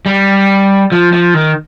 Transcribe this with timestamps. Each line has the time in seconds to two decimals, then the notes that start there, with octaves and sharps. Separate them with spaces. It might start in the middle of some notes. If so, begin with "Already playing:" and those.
0.06 G3
0.92 F3
1.13 F3
1.34 D#3